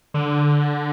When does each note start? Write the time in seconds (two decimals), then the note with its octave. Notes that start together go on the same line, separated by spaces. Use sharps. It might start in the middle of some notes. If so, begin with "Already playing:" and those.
0.14 D3